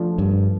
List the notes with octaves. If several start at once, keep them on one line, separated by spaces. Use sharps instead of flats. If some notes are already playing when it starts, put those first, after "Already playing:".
Already playing: F3 A3 D4 F4
G2